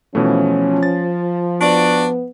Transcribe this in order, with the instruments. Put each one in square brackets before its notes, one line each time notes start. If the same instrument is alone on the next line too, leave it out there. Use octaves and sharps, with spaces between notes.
[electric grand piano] B2 E3 A3 [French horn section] F3 [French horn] C#4
[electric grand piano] A6
[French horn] B3 [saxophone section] D4 F#4 D5